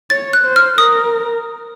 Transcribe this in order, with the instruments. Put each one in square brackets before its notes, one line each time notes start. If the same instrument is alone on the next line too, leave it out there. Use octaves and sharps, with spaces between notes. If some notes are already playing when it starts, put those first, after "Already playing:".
[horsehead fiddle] C#5 [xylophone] A6
[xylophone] F#6
[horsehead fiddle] C5
[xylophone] F6
[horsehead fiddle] A#4 [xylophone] D#6